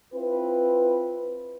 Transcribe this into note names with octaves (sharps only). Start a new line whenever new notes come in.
C4 E4 F4 B4